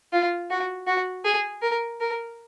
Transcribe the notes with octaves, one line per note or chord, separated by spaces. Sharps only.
F4
F#4
F#4
G#4
A#4
A#4